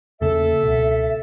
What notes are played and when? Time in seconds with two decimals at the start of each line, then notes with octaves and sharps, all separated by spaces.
0.21 E2 C#3 A#3 A4 E5
0.63 C#2 B2